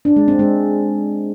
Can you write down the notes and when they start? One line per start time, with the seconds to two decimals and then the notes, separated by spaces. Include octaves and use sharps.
0.05 D4
0.16 G#3
0.28 C4
0.39 G#3